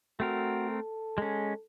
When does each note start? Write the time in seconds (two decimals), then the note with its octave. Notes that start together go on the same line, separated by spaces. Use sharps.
0.20 A3 C4 F#4 A#4
0.71 A4
1.18 G#3 C#4